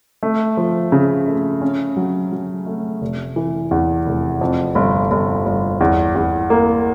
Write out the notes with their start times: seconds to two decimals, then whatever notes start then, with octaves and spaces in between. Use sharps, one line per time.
0.23 A3
0.57 F3
0.92 C#3
1.28 A3
1.62 C#4
1.96 F#3
2.32 F#3
2.67 A3
3.01 F1
3.36 E3
3.71 E2
4.06 F1
4.41 F2
4.75 G1
5.11 G1
5.46 G1
5.81 E2
6.15 E2
6.50 A#3